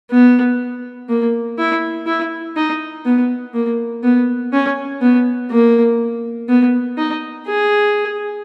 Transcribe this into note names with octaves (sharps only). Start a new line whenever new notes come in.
B3
A#3
E4
E4
D#4
B3
A#3
B3
C#4
B3
A#3
B3
D#4
G#4